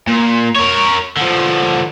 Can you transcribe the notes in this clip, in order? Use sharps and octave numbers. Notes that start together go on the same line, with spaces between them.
A#2
A#4 C#5
D3 F3